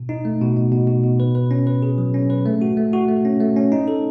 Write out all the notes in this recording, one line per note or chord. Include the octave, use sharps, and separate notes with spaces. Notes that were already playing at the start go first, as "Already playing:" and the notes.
Already playing: B2
D#4
A3
B2
B2
B2
B2
B2
B4
B4
C#4
B4
G#4
F#3
C#4
B4
A3
F#4
A3
F#4
A3
C#4
A3
C#4
D#4
A4